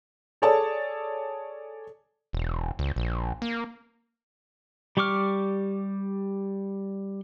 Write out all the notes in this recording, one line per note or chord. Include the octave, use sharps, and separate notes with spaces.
G#4 A4 C#5 D5 A5
E1
C#2
A#1
A#3
G3 G4 C#6 D6 F6